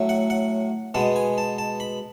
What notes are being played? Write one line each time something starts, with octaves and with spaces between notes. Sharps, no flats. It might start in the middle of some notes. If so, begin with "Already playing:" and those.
Already playing: A2 F#3 A3
F#5
F#5
B2 G#3 B3 A5
G#5
A5
A5
B5